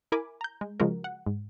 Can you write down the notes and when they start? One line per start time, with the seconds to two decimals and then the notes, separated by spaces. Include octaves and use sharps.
0.12 E4 A#4 G#5 B5 D6
0.41 A#5 G6
0.61 G#3
0.80 C#3 F3 G#3 F#4 A#4
1.04 F#5
1.26 G#2